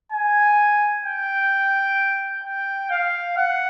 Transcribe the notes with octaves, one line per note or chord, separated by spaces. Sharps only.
G#5
G5
G5
F5
F#5